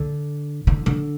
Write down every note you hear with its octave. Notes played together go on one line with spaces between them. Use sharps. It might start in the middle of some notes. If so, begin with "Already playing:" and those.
Already playing: D3
D3
D3